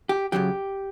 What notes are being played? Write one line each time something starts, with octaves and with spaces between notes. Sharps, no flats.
G4
F#2 C#3 F#3 G4